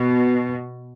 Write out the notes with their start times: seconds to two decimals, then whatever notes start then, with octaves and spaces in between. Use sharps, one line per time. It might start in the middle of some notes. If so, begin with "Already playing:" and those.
Already playing: B2